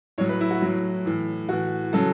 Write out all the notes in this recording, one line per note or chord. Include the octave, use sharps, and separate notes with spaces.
A2 F#3 C#5
B4
E4
F#4
A2 F#3
A2 E3
A2 E3 F#4
C#3 F#3 A4